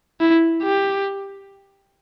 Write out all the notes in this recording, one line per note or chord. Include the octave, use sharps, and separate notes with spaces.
E4
G4